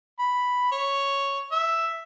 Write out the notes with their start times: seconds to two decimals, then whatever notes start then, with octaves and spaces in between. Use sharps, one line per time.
0.19 B5
0.71 C#5
1.51 E5